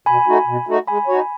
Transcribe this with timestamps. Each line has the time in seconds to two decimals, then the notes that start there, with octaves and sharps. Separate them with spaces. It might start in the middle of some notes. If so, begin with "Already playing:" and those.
0.06 B2 G#5 B5
0.27 A3 D#4 F#4
0.47 B2
0.67 A3 D#4 F#4
0.87 G#3 G#5 B5
1.07 D#4 F#4 C#5